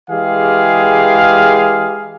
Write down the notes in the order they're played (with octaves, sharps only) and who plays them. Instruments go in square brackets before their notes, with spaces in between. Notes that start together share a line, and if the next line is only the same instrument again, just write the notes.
[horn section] E3 G#3 G4 G#4 F5